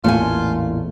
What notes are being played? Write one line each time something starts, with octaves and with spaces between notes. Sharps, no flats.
A1 E2 A#2 A3 F4 G#5